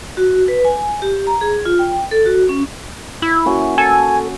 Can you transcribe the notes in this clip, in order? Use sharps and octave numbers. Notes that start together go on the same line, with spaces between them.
F#4
B4
G#5
G4
A#5
G#4
F4
G5
A4
F#4
C#4
E4
A#3 C#4 F#4
A4 G#5